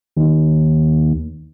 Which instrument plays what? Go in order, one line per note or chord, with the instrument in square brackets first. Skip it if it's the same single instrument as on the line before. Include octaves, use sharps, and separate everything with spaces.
[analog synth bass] D#2